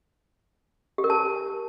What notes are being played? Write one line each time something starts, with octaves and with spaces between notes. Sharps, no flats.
G4
A#4
A5